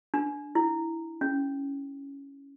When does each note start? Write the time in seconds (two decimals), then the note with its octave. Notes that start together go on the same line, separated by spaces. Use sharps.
0.14 D4
0.55 E4
1.21 C#4